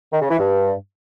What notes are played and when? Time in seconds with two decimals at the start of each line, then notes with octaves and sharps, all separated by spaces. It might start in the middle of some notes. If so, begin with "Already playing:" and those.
0.13 D#3
0.21 C#3
0.30 E3
0.39 G2